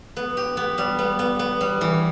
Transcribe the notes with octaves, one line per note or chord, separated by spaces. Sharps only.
B3
G4
B3
G3
B3
B3
B3
G3
E3